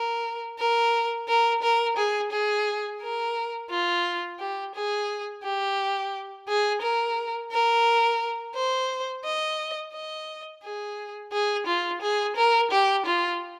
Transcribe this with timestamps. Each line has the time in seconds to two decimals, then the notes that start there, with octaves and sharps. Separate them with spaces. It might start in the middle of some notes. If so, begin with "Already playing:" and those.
Already playing: A#4
0.59 A#4
1.28 A#4
1.63 A#4
1.97 G#4
2.32 G#4
3.02 A#4
3.70 F4
4.40 G4
4.75 G#4
5.43 G4
6.48 G#4
6.82 A#4
7.52 A#4
8.55 C5
9.25 D#5
9.94 D#5
10.63 G#4
11.32 G#4
11.67 F4
12.02 G#4
12.37 A#4
12.71 G4
13.06 F4